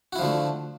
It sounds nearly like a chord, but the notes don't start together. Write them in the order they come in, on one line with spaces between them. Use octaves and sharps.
F#4 E4 F3 D3 A3